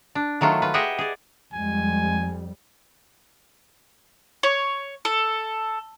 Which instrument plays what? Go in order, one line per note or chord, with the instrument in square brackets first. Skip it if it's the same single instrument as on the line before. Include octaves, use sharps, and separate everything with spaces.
[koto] D4
D#3 F#3 A3 F4
F4 B4
G4 G#4 D#5 E5 F#5
G#4 D5
[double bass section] F2 G3 [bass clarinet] G#3 [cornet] G#5
[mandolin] C#5
A4